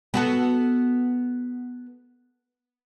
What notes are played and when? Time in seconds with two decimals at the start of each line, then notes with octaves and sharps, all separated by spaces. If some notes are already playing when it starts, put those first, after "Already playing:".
0.14 B3 F#4 A4